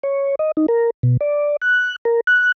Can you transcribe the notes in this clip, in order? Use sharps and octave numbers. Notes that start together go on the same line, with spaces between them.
C#5
D#5
D#4
A#4
B2
D5
F#6
A#4
F#6